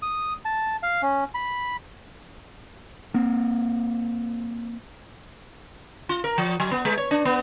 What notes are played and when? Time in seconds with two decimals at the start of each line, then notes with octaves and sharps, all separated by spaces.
0.02 D#6
0.45 A5
0.83 F5
1.02 C#4
1.34 B5
3.14 A#3 C4
6.09 F4
6.24 A#4
6.38 F3
6.60 F#3
6.71 B3
6.85 G#3
6.98 C#5
7.11 D4
7.25 B3